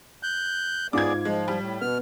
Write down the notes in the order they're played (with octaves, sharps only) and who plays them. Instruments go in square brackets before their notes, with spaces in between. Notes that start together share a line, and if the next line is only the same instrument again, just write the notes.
[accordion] F#6 G6
[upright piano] G#2 F4 [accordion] B3 G#4 D5 [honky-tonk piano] D6 G#6
[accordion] F3 [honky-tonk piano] G#3
[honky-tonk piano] G3
[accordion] A2
[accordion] B2 F6 [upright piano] B3